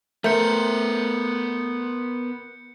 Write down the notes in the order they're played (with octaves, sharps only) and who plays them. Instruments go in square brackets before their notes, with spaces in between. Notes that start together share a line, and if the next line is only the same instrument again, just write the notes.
[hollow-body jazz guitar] A3 [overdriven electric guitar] B3 C5 [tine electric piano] A#4 [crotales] G6 C#7